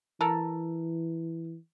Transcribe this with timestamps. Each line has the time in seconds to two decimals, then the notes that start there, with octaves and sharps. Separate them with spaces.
0.21 E3 A4 A#4